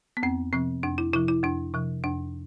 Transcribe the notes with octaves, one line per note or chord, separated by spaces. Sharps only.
B3
F2 C4
C3 F3 C4
F2 D4
E4
C3 F3 E4
E4
F2 D4
C3 F3
F2 D4